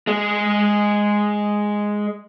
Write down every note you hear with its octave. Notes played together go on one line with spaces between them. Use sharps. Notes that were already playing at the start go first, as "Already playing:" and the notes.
G#3 G#4